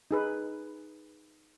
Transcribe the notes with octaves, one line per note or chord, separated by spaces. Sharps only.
D#4 G#4 B4